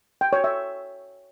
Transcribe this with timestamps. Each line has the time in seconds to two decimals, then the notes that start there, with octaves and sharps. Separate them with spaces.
0.21 G5
0.33 C#5
0.44 E5